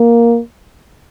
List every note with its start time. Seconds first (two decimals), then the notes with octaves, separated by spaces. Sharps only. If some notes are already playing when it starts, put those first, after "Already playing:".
Already playing: A#3